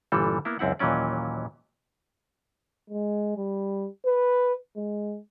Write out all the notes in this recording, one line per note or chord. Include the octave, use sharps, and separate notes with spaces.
G1 A#2 E3 G3 A4
A#3 B3 E4
C#2 F#2 C4 E4 F#5
D#2 A#2 E3 F#3 C#4 D5
G#3
G3
B4
G#3